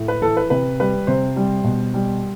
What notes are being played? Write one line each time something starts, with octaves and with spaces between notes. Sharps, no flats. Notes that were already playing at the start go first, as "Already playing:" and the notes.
Already playing: A2
B4
E3 A4
B4
C3 B4
G3 B4
C3 C5
G3
B2
G3